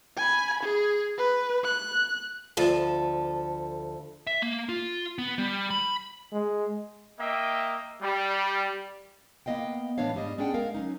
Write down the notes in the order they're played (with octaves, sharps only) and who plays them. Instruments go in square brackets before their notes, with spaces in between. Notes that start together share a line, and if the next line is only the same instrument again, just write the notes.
[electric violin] G#5 B5
G#4
B4
F#6
[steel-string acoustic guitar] D2 F3 A4
[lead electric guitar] E5
A#3
F4
B3
G3
B5
[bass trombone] G#3
[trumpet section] A#3 D#5 E5 G5
G3
[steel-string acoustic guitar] A#3 B3 D#4 D#5 F5 G5
A2 E3 B3 D4 C#5 F5
G#2 G3 D4 D#5
B3 C#4 D4 G#4 F#5 G5
G#3 A#4 F5
F#3 C#4 D#4